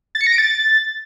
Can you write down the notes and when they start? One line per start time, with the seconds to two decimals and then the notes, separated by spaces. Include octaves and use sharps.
0.15 A6
0.21 C#7
0.27 A#6
0.32 D7
0.38 A6